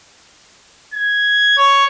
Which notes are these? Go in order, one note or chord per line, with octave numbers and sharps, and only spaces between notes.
G#6
C#5